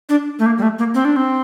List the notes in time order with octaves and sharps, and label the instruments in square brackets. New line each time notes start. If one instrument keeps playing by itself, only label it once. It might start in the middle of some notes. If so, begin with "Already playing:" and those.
[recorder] D4
A3
A#3
G3
A3
A#3
C4
D4
C4